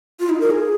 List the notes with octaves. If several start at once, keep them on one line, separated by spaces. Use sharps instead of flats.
F4
D#4
A#4
G#4